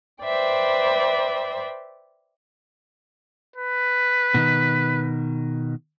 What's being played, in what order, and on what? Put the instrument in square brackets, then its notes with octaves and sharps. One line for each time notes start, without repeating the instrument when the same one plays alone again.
[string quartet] B4 C5 D5 E5 G5
[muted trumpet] B4
[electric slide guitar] B2 D#3